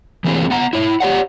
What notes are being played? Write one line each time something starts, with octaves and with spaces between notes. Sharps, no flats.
E3 A3 A#3 C4 G#4 C#5
B3 F#5 A#5
E4 C#5
G4 C#5 D5 F#5